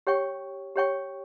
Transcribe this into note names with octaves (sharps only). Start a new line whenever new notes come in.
G4 C#5 G5 C#6
G4 C#5 G5 C#6